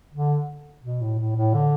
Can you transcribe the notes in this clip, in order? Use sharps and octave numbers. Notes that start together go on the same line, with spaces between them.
D3
B2
A2
A2
A2
D3